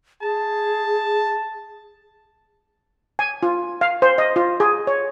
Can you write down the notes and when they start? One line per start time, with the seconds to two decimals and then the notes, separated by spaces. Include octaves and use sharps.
0.22 G#4 A5
3.19 G#5
3.43 F4
3.81 F5
4.02 C5
4.18 D#5
4.36 F4
4.60 G#4
4.87 C#5